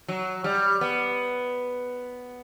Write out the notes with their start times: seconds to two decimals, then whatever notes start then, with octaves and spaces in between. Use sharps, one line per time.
0.08 F#3
0.44 G3
0.81 B3